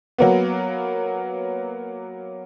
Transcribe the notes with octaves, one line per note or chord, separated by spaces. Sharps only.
F#3 A#3 B3